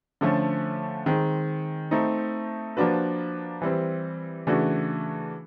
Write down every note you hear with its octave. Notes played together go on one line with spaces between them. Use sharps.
D3 F3 A3 C#4
D#3 G#3 C4
A3 C4 D#4
F3 A#3 D4 F#4 B4
E3 G3 C4
C#3 E3 A3 D4 F#4